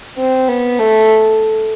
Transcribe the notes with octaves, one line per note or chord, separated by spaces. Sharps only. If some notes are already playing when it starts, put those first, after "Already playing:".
C4
B3
A3